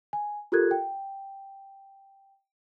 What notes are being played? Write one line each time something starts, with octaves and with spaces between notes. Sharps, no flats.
G#5
F4 G4 A4 A#4 F#6 G#6
G5